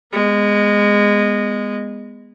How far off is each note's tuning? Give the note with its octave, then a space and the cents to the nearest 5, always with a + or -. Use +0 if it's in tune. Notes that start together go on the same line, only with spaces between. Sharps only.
G#3 -15 B3 +0